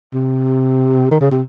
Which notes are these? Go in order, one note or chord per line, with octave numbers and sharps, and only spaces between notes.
C3
D#3
C#3
C3